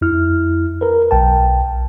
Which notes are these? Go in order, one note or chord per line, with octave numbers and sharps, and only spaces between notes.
F2 E4 F6
A#4 B4
B1 G5 A5